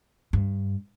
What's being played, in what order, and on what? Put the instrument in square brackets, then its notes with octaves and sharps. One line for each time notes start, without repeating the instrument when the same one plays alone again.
[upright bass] G2